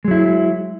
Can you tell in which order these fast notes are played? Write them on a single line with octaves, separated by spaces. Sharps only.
G#3 F#3 E4